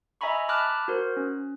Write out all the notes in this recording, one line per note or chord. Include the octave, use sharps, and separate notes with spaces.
D#5 E5 G#5 A#5 B5 C#6
A5 B5 D6 F6 F#6
F#4 A#4 C5
C#4